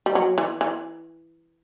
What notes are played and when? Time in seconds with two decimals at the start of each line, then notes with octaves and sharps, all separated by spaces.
0.06 G3
0.15 F#3
0.38 E3
0.61 E3